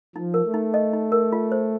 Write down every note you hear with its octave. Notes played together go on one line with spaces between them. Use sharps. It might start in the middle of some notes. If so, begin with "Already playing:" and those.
F3 D#4
A#4
A3
D#4
D#5
D#4
A#4
F4
C5